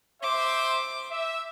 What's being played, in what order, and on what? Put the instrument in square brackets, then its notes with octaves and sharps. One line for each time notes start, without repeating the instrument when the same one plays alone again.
[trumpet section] C5 E5 [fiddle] D6
[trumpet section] E5